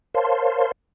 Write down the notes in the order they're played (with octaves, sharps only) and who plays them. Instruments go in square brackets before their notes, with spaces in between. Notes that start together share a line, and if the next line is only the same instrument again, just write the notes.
[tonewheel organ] A#4 C5 C#5 F5 A5 C6